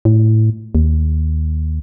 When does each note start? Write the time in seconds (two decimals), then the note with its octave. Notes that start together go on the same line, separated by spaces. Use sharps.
0.05 A2
0.75 D#2